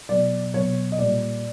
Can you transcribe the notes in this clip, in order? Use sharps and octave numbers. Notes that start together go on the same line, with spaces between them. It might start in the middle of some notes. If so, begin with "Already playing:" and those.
B2 F#3 D5
B2 F#3 C#5
D#5
A#2 G3 D5